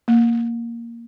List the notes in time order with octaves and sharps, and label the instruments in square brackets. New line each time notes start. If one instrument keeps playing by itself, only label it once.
[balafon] A#3